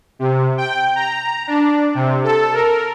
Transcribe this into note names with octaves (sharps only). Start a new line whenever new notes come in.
C3
G5
A#5
D4
C3
A4
A#4